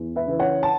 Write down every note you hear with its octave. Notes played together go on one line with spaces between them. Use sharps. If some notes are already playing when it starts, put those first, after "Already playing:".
Already playing: E2
B4 E5
C#3 E3
C#5 F#5
A5